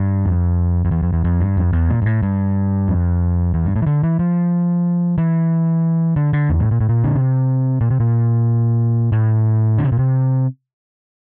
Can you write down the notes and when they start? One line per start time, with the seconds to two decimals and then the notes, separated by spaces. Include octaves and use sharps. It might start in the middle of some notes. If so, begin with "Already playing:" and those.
Already playing: G2
0.26 F2
0.85 F2
0.91 E2
1.03 F2
1.13 E2
1.24 F2
1.41 G2
1.57 F2
1.73 E2
1.90 A#2
2.02 G2
2.06 A2
2.23 G2
2.88 F2
3.54 E2
3.65 G2
3.76 A2
3.82 E3
3.87 D3
4.03 E3
4.19 F3
5.18 E3
6.16 D3
6.33 D3
6.50 E2
6.60 A2
6.71 A#2
6.81 A2
6.89 A#2
7.04 D3
7.15 C3
7.81 A#2
7.91 C3
8.00 A#2
9.12 A2
9.78 D3
9.85 C3
9.92 A#2
9.99 C3